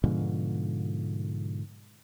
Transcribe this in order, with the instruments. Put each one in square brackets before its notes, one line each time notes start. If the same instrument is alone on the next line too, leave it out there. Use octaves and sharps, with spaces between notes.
[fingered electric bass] G#2 B2 D3 F3